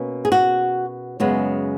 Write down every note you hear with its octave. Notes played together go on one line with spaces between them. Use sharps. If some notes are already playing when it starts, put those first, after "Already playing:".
Already playing: B2 A#3 C#4
G#4
F#4
F#2 C#3 G#3 B3